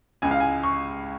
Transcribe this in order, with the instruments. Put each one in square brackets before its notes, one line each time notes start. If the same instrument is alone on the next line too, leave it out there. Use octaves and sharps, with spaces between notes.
[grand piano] C#2 C#3 G#3 G#5
F5
G#5
C#6